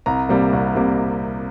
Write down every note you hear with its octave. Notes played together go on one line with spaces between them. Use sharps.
C2 A#5
C3 G3 A#3
C2
C3 G3 A#3